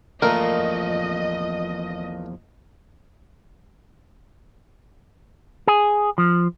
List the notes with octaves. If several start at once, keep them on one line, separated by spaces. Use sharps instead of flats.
E2 A#2 F3 A3 A#4 D#5
G#4
F3